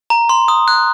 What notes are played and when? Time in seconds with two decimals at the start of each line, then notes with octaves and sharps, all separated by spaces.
0.10 A#5
0.29 C6
0.48 D#6
0.68 F#6